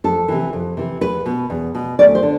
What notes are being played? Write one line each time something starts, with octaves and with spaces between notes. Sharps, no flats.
F2 A4
C3 E3
F2
C3 E3
E2 B4
B2
E2
B2
D2 D5
C5
D3